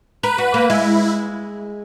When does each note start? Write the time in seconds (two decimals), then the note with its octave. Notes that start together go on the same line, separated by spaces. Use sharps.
0.23 A#4 B4
0.38 F#4
0.54 A#3
0.69 G#3 E4